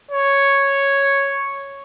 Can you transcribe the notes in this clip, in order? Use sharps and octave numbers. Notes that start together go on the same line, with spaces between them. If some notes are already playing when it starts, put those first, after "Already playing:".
C#5